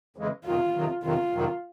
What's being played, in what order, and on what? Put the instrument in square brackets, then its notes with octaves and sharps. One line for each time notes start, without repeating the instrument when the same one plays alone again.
[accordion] F2 C#3 E3 G#3
[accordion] F2 C3 D#3 F#3 [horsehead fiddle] F4
[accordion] F2 C3 D#3 F#3
[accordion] F2 C3 D#3 F#3 [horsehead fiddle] F4
[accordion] F2 C3 D#3 F#3